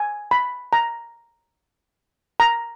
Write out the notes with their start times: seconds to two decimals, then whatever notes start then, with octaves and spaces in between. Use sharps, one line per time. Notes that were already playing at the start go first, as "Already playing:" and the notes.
Already playing: G#5
0.31 B5
0.73 A#5
2.40 A#5